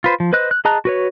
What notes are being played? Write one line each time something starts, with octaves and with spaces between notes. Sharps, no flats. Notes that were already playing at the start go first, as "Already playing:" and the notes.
F4 B4 C5
F3
B4 C5 D#5 F#6
F#6
G#4 D#5 A5 A#5 F#6
F#4 B4 C#5